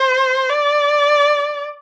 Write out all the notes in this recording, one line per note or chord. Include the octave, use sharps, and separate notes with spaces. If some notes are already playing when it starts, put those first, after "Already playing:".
Already playing: C5
D5